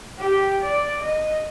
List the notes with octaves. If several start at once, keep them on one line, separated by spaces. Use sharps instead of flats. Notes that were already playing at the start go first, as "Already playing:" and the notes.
G4
D5
D#5